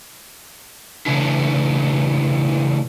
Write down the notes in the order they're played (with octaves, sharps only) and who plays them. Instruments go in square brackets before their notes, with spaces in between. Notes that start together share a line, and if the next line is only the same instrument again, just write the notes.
[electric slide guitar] A2 C#3 E3 D4 E4